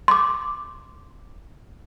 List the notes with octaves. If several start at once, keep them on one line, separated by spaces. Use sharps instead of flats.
C6 D6